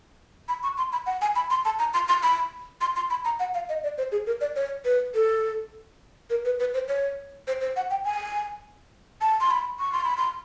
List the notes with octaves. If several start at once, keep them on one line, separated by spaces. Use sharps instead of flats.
B5
C#6
C6
B5
F#5
G#5
B5
C6
A5
A#5
C6
C6
B5
C6
C6
B5
A#5
F#5
F5
D#5
D5
C5
G#4
A#4
D5
C#5
B4
A4
A#4
B4
B4
C5
C#5
C5
C5
F#5
G5
G#5
A5
C6
B5
C#6
C6
B5
C6